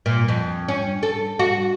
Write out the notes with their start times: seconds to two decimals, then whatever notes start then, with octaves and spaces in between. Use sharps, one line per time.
0.06 A#2
0.28 F2
0.68 C#4
1.03 A4
1.39 F#4